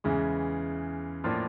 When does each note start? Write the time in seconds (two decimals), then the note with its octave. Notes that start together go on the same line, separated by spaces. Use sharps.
0.04 E2 C#3 E3 G#3
1.24 A2 F3 A#3 D4 F4